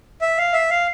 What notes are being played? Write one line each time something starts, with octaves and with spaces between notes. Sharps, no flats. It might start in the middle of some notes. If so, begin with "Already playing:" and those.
E5
F5
E5
F5